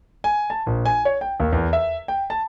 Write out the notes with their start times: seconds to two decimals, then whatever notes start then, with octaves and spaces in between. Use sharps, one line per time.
0.24 G#5
0.50 A5
0.66 A#1
0.85 G#5
1.05 C#5
1.21 G5
1.40 D#2
1.52 E2
1.73 E5
2.08 G5
2.30 A5